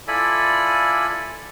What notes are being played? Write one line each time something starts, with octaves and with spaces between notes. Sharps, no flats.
E4 F4 A4 D5 G#5 B5